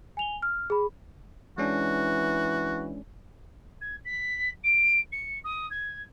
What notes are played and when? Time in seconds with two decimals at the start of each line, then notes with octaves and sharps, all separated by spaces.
0.17 G#5 F7 G7
0.42 F6
0.70 G#4 B5
1.58 E3 G#3 C#4 D4 F#4
3.81 G#6
4.04 B6
4.63 D7
5.12 C#7
5.44 D#6
5.70 G#6